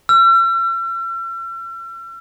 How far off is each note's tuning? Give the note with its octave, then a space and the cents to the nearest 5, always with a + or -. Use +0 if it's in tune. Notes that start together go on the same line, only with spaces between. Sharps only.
E6 +45